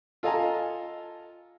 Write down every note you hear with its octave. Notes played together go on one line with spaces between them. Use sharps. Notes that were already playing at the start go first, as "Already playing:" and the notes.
F4 A4 D#5 F5 G#5 A#5